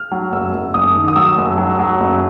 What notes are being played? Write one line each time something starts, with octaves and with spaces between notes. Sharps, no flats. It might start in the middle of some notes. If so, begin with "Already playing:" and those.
Already playing: F6
F#3
F#1 E6
F#1
F#1 D#6
D#3
D#6
F#3 E6
F#1
F#3
F#3
F#1